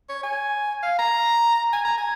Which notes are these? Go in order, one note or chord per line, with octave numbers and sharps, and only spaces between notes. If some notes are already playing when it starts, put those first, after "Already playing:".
C#5
G#5
F5
A#5
G#5
A#5
G#5